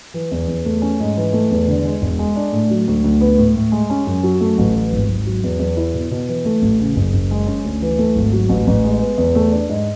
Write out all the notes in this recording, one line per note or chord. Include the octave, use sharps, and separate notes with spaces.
E3
E2
E2
A3
C#4
G#2
E3
A3
E2
D3
G#3
E1
G#3
D4
A2
F#3
D2
D2
B3
A2
A2
G#3
C#4
F#2
F#3
A3
A1
E3
G#1
G#1
F#3
E2
E2
E4
B2
B2
E3
A3
A1
C#3
F#1
F#1
G#3
C#4
D2
E3
A3
G#1
F#3
A1
A1
G#3
B3
E2
A3
D4
G#2